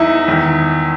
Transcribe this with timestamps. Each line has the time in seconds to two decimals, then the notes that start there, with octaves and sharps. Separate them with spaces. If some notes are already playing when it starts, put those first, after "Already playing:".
Already playing: E2 D#4 E4 D#5 E5
0.28 E2 D#3